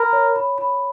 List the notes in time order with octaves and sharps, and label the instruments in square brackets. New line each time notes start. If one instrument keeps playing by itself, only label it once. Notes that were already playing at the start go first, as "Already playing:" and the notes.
Already playing: [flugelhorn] A#4 [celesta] B5
[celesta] C#5
B5
B5